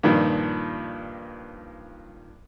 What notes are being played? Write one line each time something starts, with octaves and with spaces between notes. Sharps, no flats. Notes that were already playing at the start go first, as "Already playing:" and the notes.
G2 A#2 D#3 F3